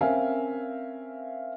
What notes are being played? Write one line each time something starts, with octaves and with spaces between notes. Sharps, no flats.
C4 C#4 A#4 E5 F5 G#5